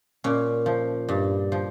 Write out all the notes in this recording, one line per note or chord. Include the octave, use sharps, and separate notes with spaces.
A#2 C#4
F3
G2
F3